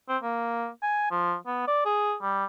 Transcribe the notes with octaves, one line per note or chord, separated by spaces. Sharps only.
C4
A#3
G#5
F3
B3
D5
G#4
G3